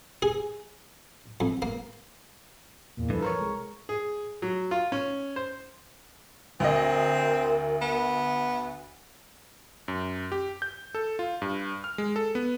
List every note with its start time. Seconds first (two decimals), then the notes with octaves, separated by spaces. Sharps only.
0.22 G#4
1.40 F2
1.62 A#3
2.97 E2 A#2
3.10 G2 E3 F3 A4 B4
3.22 A#4 C5 C#5
3.37 C2 G#3
3.89 G#4
4.42 F#3
4.71 F4
4.92 C#4
5.36 C5
6.60 D2 C4 A#4 D#5
7.82 B3
9.88 F#2
10.32 G4
10.62 G6
10.95 A4
11.19 F4
11.42 G2
11.84 F6
11.98 G#3
12.16 A4
12.35 B3